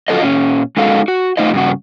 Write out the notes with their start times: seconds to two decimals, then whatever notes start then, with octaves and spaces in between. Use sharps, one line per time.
0.08 F4 F#4 A4 C5 D#5
0.22 A#2 C#4
0.77 G#3 C#4 D#4 F#4 A4 F5
1.08 F#4
1.37 A3 D#4 F4 C5 D#5
1.54 G2 C#3 F#4